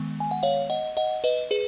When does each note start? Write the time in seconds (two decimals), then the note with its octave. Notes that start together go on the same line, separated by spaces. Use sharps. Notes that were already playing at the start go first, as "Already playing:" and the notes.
Already playing: D#3 G#3 B3
0.20 G#5
0.31 F#5
0.43 C#5 F5
0.70 D#5 F#5
0.97 D#5 F#5
1.24 B4 D#5
1.51 G#4 B4